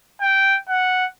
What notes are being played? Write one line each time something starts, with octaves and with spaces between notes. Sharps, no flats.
G5
F#5